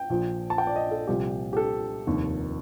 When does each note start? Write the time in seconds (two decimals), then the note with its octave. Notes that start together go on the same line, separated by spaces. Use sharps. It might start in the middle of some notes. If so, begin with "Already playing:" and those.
Already playing: G5
0.10 A#1 A#2 F3
0.50 A5
0.58 G5
0.67 D5
0.76 D#5
0.91 A4
1.07 C2 A#2 F3 G4
1.53 G4
1.57 A4
2.07 F1 D#2 D#3